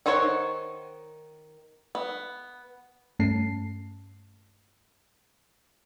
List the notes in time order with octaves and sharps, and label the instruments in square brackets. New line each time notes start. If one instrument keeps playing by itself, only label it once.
[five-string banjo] D#3 D#4 C5 C#5 F#5
B3
[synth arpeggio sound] G2 A3 C#4 A5 C7